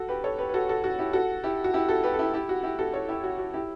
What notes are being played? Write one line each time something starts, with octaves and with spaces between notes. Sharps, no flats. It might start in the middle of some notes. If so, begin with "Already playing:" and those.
Already playing: F#4 A4
G4 B4
A4 C#5
G4 B4
B4
F#4 A4
F#4 A4
F#4
E4 G4
F#4 A4
E4 G4
F#4
E4 G4
F#4 A4
G4 B4
A4
E4 G4
E4 G4
F#4
E4 G4
F#4 A4
A4 C#5
E4 G4
F#4
F#4
E4 G4